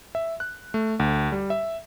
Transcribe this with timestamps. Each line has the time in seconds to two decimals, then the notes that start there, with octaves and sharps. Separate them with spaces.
0.15 E5
0.40 F#6
0.74 A3
1.00 D2
1.32 G3
1.50 E5